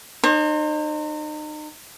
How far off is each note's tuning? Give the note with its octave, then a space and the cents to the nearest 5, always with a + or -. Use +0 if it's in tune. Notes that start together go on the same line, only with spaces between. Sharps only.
D#4 -35 C5 +30